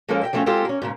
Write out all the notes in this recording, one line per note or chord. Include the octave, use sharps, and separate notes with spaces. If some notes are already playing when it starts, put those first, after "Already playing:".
F3 G#3 A#3 C#4 A4 A#4
D#5 E5 G5
F3 G3 A3 C4 C#4 F4
G#3 C4 F4 G4 A4 C5
A#3 C#4
G#2 C#3 A#3